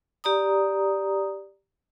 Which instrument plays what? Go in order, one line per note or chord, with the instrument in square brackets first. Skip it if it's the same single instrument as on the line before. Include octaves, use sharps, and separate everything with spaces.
[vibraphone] G4 D5 A#5 D#6